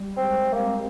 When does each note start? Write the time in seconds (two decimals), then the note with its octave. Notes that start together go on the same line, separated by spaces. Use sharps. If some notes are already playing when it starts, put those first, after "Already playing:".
Already playing: G3
0.16 G#3 C4
0.53 A#3 C4